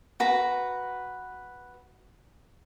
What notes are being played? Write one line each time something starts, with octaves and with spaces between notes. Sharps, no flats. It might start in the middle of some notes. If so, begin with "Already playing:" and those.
F#4 B4 A#5